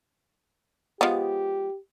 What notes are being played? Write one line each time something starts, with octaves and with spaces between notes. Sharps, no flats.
F3 G#3 B3 G4